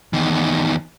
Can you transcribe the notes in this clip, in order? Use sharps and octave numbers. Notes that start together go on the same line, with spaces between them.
E2 D#3